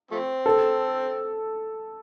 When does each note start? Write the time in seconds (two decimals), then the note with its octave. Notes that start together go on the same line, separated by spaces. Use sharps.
0.11 F3 A3 C4
0.46 A4